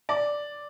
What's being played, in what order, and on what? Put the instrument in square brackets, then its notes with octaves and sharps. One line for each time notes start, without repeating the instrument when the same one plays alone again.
[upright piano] D5